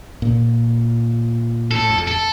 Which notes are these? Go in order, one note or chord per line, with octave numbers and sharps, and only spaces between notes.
A#2
A2 A4
F2
A4